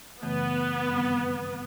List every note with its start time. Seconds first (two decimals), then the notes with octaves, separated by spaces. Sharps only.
0.22 F#2 C#3 E3 A3 B3
0.88 G2 D#3 G3 C4